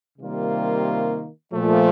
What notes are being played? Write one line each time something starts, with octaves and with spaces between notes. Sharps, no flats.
C3 D#3 G3 A#3 F4
A#2 F3 A3